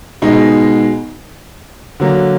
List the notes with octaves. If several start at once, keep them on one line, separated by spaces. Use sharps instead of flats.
B2 G#3 D#4
D3 F#3 A#3